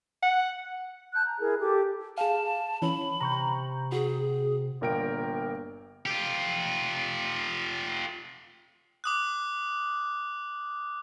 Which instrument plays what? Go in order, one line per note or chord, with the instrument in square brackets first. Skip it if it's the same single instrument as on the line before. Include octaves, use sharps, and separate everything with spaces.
[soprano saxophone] F#5
[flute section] A5 F#6 G6
A#5
E4 G#4 A#4
G4 A4 D6
[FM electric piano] G#4 F5 [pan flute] A5
[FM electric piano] E3 C#4 [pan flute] B5
[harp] C3 [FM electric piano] A#5 C#6 G6
[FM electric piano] F#4 [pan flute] G#4
[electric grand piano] G1 A#2 A#4 G5 D7
[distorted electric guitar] F4 G4
[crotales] D6 D#6 F#6